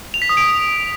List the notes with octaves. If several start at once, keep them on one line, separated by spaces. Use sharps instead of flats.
F7
B6
D#6
D7